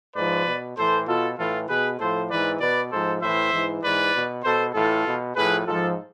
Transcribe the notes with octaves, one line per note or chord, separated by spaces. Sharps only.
G#2 F3 B4 D5
B2
A2 E3 A4 C5
B2 F4 A4
A2 E3 F4 A4
B2 G#4 B4
A2 F3 A4 C5
G#2 E3 B4 D5
B2 B4 D5
G#2 F3 A4 C5
A2 E3 C5 E5
G#2 E3
G#2 E3 B4 D5
B2
B2 A4 C5
A2 E3 F4 A4
B2
A2 F3 G#4 B4
G#2 F3 F4 A4